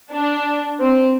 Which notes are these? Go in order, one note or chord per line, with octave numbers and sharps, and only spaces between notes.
D4
C4